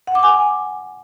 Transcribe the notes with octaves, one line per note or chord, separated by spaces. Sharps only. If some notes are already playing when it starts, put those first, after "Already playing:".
F#5
D6
G#5